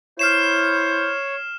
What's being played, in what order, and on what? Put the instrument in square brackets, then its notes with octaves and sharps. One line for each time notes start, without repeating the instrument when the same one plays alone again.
[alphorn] E4 [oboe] C5 [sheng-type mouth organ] C#5 [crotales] F6 C7 E7